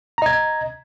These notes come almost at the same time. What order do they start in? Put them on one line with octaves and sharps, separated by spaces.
A#5 D#5 G#6